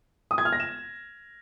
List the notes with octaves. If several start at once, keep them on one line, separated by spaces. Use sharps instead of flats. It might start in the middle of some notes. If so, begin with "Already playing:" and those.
D#6
G#6
F6
A#6
E7